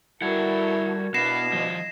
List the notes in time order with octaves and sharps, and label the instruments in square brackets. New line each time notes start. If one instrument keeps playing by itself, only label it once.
[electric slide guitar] G3 F#5 [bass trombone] E4 [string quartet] F#4 A4 A#4 [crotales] G#6
[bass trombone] B2 [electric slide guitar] B3 [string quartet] D4 E4 F5 [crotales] A#6 C7 E7
[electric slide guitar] F3 G3 [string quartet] D#5